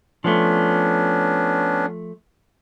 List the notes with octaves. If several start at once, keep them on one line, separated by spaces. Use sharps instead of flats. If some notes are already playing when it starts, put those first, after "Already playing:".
F3 A3 B3 C#4 D4